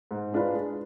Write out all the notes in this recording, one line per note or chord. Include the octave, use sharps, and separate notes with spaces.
G#2
G#3 D4 F4 B4
G#3